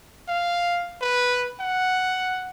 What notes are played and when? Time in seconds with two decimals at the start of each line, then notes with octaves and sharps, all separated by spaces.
0.28 F5
1.01 B4
1.60 F#5